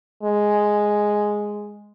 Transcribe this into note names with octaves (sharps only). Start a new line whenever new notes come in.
G#3